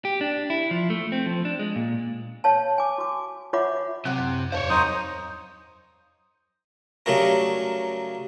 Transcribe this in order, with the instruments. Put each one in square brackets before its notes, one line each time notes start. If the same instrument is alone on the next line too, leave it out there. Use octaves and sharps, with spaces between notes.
[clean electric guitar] G4
D4
E4
F3
A3
C4
F3
D4
G#3
A#2
[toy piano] C#5 F5 A5
G#5 D6
F#4 D6
F4 C#5 E5 F#5 B5 D6
[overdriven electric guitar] C3 [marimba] F#3 F#5 F#6
[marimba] F#2
[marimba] E2 G#2 [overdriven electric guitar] C5 C#5
[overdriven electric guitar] F#2 [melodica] D#4 C5 D#6
[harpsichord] C#3 F#3 G3 A3 A#4